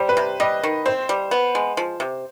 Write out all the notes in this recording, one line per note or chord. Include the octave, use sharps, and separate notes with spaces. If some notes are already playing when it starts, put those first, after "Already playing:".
Already playing: G3 C5
B4
C3
G3 D#5
D#3
C4 C5
G3
B3
G#3
F3
C3